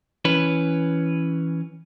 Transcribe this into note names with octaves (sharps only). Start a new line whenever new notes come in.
E3 C#4 B4